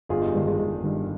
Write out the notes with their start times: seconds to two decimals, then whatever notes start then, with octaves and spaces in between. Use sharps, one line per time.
0.09 G1 F4 G#4
0.22 D#4 G4
0.34 G2 D#3 G#3
0.47 G#3
0.58 G1 G#3
0.84 G2 D#3